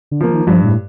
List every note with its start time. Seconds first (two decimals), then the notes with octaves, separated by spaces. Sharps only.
0.11 D3
0.21 F3 A#3
0.29 D#3
0.47 G2 F3
0.64 A2